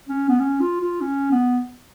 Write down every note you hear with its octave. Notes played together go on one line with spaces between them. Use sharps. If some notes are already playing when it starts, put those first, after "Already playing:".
C#4
B3
C#4
F4
F4
C#4
B3